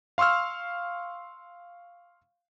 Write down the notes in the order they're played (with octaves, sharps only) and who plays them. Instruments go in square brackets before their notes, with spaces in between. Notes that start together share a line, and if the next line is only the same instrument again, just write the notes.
[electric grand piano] F5 C6 C#6 E6 F6